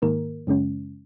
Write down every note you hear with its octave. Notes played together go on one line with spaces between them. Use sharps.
G#2 D#3 A#3 A#4
F#2 C#3 G#3 C#4